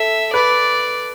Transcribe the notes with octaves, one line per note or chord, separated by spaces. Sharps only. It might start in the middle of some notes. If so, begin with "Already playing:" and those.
Already playing: A4 E5
B4 D5